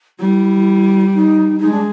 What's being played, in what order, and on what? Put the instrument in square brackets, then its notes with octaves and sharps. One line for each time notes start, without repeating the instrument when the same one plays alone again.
[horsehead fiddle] G3 [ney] E4
[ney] D#4
[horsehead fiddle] G#3 [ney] D#4
[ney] D4